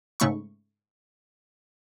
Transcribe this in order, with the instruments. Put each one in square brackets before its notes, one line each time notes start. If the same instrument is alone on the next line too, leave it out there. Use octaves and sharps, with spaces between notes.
[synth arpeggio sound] G#2 C#3 A3 B5 C#6